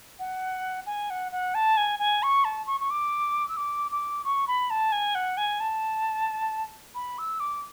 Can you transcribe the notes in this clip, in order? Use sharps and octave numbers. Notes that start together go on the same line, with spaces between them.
F#5
G#5
F#5
F#5
A5
G#5
G#5
C#6
A5
C#6
C#6
D6
E6
D6
D6
C#6
B5
A5
G#5
F#5
G#5
A5
B5
E6
D6